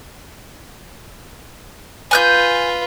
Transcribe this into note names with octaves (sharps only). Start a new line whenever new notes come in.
F4 B4 G#5 F#6 G6